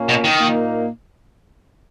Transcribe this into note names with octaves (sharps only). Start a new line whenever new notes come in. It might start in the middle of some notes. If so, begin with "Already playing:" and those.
Already playing: A#2 A#3 C#4
B2
D#3
A#2 A#3 D#4